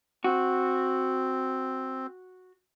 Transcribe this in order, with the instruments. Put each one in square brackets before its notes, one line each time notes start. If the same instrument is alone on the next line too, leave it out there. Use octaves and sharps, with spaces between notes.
[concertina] C4 [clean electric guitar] F#4